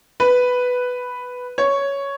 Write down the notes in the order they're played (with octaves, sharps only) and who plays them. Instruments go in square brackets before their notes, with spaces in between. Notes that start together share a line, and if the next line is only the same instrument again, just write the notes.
[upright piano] B4
C#5